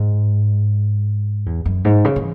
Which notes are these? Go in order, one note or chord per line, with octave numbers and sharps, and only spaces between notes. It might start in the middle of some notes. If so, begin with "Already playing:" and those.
Already playing: G#2
E2
F#2
G#2
C#3
E3